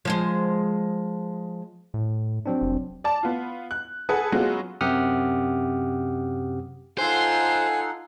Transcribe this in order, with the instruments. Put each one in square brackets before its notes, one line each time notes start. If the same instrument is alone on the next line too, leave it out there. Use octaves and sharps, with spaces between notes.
[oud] F3 G#3 C5
[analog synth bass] A2
[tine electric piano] F#3 C4 D4
[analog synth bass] F1
[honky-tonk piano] D5 A5
B3 F4
F#6
G#4 A4 B4 F#5 G#5 D#6
F#3 G#3 B3 C#4 F4 F#4
[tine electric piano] F#2 C3 G4 F#5 D#6 F6
[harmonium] D#4 A4 F#5 [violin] F4 C7 [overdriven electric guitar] C5 [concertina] G#5 F#6